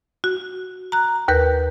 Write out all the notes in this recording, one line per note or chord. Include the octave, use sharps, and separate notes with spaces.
F#4
A#5 F#6
D#2 A#4 B4 G6